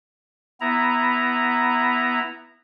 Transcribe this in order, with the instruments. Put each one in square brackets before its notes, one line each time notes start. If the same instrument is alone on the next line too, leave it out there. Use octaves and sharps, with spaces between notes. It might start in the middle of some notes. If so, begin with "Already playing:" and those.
[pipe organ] B3 E4 A#5